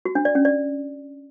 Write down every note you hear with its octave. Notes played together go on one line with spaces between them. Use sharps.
F#4
D4
D5
C#4
D5